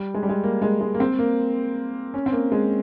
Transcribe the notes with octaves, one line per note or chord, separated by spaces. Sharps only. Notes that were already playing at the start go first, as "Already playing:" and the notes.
Already playing: G3
G#3
G3
G#3
A#3
G#3
G#3
A#3
C4
A#3
C#4
C4
A#3
G#3